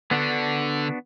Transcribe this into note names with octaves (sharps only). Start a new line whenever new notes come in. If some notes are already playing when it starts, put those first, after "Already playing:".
D3 B3 D4 F#4